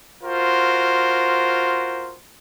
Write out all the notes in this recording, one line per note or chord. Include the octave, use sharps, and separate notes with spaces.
F4 F#4 A#4 C5